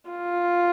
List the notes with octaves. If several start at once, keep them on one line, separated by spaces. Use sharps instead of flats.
F4